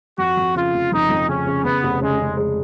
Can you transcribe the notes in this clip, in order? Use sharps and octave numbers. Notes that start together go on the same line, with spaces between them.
F2 F#4
F2
C#3 F4
F1
F2 D#4
F2
C#3 C#4
C#3
C#3 B3
F1
C#3 G#3
C#3
G#3